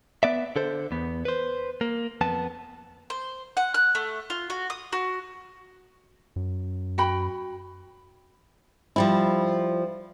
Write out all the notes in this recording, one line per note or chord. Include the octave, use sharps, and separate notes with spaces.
B3 D5 E5
D3 A4 C5
E2 B3
B4 C5
A#3
F2 B3 A5
C5
F#5
F#6
A3
F4
F#4
D#6
F#4
F#2
F#4 G5 B5
F3 G3 E4